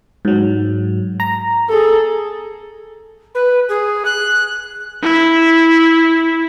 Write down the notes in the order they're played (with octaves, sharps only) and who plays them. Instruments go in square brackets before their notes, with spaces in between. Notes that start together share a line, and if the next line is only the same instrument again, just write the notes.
[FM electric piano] G#2 F#3
A#5
[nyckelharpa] G#4 A4
[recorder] B4
G#4
F#6
[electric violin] E4